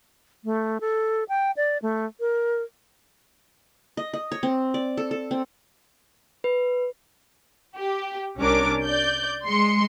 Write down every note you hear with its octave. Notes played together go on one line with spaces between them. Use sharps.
A3
A4
G5
D5
A3
A#4
D#5
D#5
C#5
C4
D5
A4
A4
C4
B4
G4
C2 C#4 D4 A#4 D6
D5 G6
G#3 C6 C#7